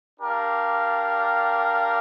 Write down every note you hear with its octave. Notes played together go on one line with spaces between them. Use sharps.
D4 G4 A#4 D5 F5